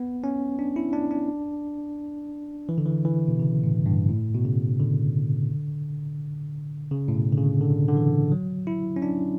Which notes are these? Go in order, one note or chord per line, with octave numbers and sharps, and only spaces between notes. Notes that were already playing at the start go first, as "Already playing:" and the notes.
Already playing: B3
C#4
D4
E4
D4
D4
E3
D3
E3
E3
B2
C#3
A2
G2
A2
B2
C#3
D3
C#3
A2
B2
D3
C#3
D3
D3
E3
F#3
E4
C#4
D4